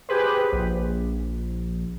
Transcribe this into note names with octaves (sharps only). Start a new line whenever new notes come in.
G4 G#4 B4 C5
A#1